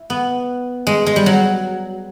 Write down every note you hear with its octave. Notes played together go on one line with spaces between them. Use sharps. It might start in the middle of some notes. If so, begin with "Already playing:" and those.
Already playing: E4
B3
G#3
G#3
G3
F#3